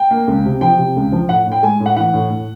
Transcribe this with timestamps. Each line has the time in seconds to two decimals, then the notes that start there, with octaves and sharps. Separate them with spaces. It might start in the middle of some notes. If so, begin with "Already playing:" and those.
Already playing: G5
0.11 A#3
0.27 C#2
0.45 C3
0.61 F3 G5
0.78 C3
0.96 C#2
1.12 F3
1.29 A2 F#5
1.46 A2
1.52 G5
1.63 G#3 G#5
1.80 A2
1.86 F#5
1.96 E3 F#5
2.14 A2
2.30 A2